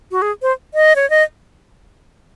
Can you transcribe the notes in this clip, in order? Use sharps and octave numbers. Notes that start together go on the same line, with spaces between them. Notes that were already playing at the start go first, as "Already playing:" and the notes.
F#4
G#4
C5
D#5
C#5
D#5